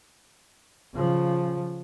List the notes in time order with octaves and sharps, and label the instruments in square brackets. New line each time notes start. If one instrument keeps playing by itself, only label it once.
[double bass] C#3 F3